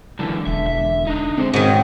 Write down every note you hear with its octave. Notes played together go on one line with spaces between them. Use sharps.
C#2 F#2 D3 E3 A4
E1 E5
E5
D4 D#4
D3 G#3 C4 C5
G#2 B2 D#3 C#4 F#4 G#4